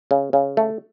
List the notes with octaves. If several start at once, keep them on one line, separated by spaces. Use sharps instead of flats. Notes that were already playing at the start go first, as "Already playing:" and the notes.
C#3
C#3
A3